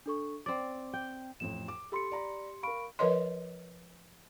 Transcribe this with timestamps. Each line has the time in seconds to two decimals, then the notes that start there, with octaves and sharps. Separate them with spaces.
0.06 D4 A4 C#6
0.46 C4 D5 D6
0.93 G5
1.40 A1 F2 A2 E7
1.68 D6
1.92 G4 A4 B5 C6 C#7
2.11 D5 A#5 B5
2.63 A#4 F5 B5 C#6 D7
2.99 F3 A#4 B4 C#5 D#5 C6